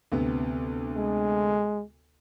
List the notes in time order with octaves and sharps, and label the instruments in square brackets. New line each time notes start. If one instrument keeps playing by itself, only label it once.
[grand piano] D2 C3 B3
[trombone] G#3